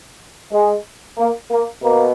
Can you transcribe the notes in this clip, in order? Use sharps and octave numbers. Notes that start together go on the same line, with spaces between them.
G#3
A#3
A#3
B2 A#3